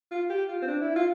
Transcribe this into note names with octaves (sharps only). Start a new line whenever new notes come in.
F4
G4
F4
C4
D4
E4
F4